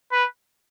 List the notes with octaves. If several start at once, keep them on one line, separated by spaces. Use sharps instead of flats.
B4